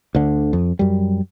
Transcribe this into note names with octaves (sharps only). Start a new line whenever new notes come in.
D2 D3
F2
F#2 G3